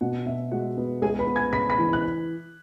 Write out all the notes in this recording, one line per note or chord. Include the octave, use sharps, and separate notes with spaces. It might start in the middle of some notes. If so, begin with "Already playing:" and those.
B2 F#4 F#5
B2 E5
G#3 F#4 F#5
B3
C#2 G#4 G#5
B4 B5
B3
G#5 G#6
C#3 B5 B6
B5 B6
E3
F#6